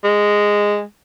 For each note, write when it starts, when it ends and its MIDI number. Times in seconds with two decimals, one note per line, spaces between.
0.04 0.83 56